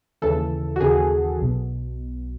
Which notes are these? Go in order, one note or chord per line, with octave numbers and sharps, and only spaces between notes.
D#2 C#3 E3 A4
F#4
D#2 C#3 E3 G#4
B1 B2